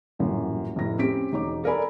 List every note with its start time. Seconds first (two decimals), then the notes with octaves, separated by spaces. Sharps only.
0.19 D#1 A1 F#2
0.76 F1 A2 A#6
0.98 C4 C#4 G4 B6 D7
1.32 E1 D#4 C#5 D6
1.64 A4 A#4 D5 G#5 B5